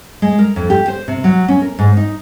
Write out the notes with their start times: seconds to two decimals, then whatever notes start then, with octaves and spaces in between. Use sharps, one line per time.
0.22 G#3
0.39 A#4
0.56 F2
0.70 G4
0.88 C5
1.08 C3
1.24 F#3
1.48 C#4
1.62 A#4
1.79 G#2
1.97 D#4